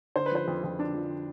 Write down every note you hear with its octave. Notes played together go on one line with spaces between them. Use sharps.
D3 C5
B4
F3 C5
F2
F2
D3 D4
F3